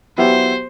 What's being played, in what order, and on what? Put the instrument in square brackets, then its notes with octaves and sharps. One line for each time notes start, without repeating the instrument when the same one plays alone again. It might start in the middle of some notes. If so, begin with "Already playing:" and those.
[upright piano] F#3 B3 E4 G4 [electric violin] C5